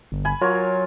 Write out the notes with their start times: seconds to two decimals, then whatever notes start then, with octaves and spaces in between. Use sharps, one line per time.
0.12 G1
0.25 G#5 B5
0.41 F#3 F4 A#4 C#5